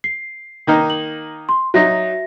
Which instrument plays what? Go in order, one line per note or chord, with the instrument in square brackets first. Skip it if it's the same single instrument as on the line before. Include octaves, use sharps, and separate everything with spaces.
[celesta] C7
[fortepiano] D#3 A#3 D#4
[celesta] F#7
C6
[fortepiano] F#3 D#4 [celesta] F#4 E5 A#6